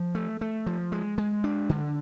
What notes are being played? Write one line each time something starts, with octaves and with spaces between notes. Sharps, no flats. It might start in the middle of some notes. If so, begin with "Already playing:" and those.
Already playing: F3
A3
A3
F3
G#3
G#3
D4
D3